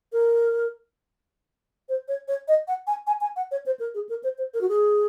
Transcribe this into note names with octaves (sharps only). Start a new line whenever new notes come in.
A#4
C5
C#5
C#5
D#5
F#5
G#5
G#5
G#5
F#5
C#5
C5
A#4
G#4
A#4
C5
C5
A#4
F#4
G#4